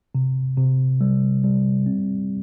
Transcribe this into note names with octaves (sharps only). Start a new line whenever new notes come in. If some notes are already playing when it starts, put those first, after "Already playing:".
C3
C3
G3
G3
C4